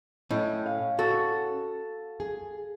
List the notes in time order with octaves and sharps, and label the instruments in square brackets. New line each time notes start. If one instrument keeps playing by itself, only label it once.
[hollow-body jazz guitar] A2 [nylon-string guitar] C#4 E4 D#5
[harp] F5
[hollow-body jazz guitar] F#4 [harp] A4
[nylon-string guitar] G#4